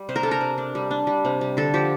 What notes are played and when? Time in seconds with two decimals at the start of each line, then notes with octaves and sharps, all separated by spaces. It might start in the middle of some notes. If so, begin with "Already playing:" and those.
Already playing: G3
0.09 C3 C5
0.16 A#4
0.23 D4 A4
0.31 A#4
0.41 C3
0.58 D4
0.75 G3
0.91 D4
1.07 G3
1.25 C3
1.41 G3
1.57 D3 A4
1.74 F3 G4